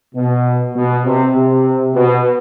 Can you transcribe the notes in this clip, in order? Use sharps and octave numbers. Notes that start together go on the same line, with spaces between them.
B2
B2
C3
C3
B2